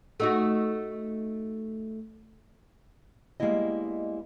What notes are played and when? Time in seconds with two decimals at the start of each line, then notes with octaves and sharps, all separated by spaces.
0.20 A3 D#4 F#4
3.40 G3 G#3 A#3 B3 E4 D#5